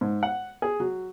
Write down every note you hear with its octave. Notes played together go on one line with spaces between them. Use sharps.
G#2
F#5
G#4
F#3